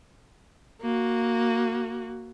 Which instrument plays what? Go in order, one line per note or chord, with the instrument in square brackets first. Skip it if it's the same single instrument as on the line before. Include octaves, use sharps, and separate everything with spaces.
[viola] A#3 F#4